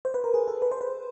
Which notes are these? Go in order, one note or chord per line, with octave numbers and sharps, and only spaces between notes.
C5
B4
A#4
G#4
A4
B4
C5
B4